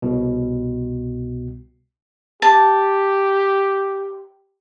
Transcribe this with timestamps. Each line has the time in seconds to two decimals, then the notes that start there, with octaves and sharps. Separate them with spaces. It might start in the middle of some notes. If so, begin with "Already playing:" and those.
0.02 C2 B2
2.42 G4 A5